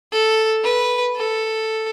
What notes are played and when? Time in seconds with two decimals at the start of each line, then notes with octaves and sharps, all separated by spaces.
0.12 A4
0.64 B4
1.16 A4